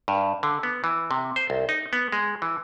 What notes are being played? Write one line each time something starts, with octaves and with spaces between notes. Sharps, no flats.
G2
D3
B3
E3
C3
C5
C2
D#4
B3
G#3
E3